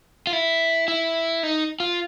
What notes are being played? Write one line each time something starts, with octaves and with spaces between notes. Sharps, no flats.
F4
E4
E4
D#4
F4